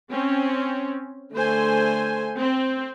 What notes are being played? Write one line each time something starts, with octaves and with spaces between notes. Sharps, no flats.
C4 C#4
D3 A3 C5 G#5
C4